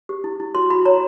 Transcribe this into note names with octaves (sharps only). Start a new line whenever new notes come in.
G4
E4
E4
F#4 C6
F#4 B5
C#5 A#5